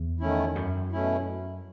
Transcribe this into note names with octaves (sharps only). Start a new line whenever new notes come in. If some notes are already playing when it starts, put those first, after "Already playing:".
Already playing: E2
D#3 A3 C#4 E4
F#2
B2 A3 C#4 E4